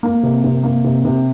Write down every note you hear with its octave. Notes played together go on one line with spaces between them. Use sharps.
A#3
C3
C3
A#3
C3
C3